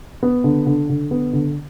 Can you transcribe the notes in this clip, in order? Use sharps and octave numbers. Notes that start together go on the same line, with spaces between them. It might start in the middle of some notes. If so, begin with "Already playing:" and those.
B3
D3
D3
D3
B3
D3